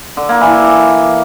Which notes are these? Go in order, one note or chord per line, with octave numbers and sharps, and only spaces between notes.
D3
A#3
E3